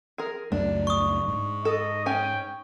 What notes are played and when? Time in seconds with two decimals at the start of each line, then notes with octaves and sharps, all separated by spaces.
0.18 G#4 A#4
0.52 C#2 F#2 A3 D4
0.87 C#6 D#6
1.28 G#2
1.65 A4 D#5
2.06 C#4 G5 G#5